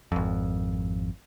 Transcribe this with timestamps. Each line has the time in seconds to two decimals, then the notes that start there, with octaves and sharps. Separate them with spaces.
0.12 G#1 F2